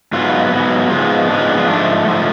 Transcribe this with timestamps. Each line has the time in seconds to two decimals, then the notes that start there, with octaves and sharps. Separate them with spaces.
0.13 G#2 F#3 B3 F4
0.52 G#2 F#3 B3
0.90 G#2 F3 G#3 B3 F4
1.28 G#2 F3 G#3 B3 D4
1.39 C#4
1.48 D4
1.58 F4
1.67 G#2 F3 A3 D4
2.06 G#2 F3 A3